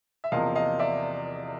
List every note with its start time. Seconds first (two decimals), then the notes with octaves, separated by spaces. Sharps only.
0.24 E5
0.32 E2 C3 F3 A#3 D#5 F5
0.56 D#5 F5
0.79 D5 E5